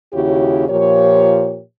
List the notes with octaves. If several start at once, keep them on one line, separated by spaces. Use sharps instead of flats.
D#2 C#3 E4 F#4 G4 C#5
A#2 F3 G4 A#4 C#5